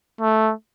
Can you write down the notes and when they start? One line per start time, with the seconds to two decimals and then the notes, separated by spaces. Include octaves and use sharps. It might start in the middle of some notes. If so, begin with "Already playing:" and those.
0.21 A3